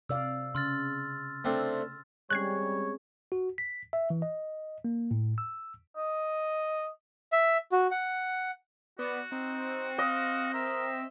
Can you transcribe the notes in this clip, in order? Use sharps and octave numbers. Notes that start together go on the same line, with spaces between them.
C3 D5 F5 E6
C#3 C6 F6 A6
A3 C4 D4
G3 G#3 C4 C#4 C#5 F#6 G#6 C7
F#4
B6
E5
E3
D#5
A#3
A2
E6
D#5
E5
F#4
F#5
B3 F#4 D5
C4 D#4
D#5 F5
A#4 E5